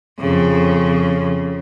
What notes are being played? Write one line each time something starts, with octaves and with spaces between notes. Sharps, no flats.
F2 C#3